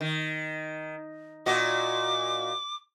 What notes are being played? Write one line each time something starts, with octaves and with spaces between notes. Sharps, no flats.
D#3
A#2 F#4 D#5 D6